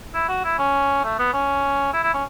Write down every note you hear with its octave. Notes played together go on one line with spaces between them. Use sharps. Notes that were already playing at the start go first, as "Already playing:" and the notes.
E4
F#4
E4
C#4
A3
B3
C#4
E4
E4
C#4